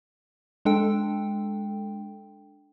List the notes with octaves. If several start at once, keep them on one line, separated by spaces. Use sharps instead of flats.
G#3 D4 A4 G5